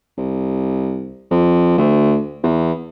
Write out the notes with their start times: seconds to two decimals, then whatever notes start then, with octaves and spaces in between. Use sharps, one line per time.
0.18 C2
1.31 F2
1.78 D2
2.43 E2